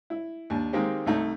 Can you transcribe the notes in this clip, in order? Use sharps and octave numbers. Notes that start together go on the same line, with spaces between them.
E4
D#2 D4
D#3 G#3 A#3 C4 G4
C2 A3 D#4